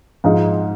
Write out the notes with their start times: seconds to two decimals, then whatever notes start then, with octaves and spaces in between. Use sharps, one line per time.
0.24 G#2 F3 G#3 D#4 F5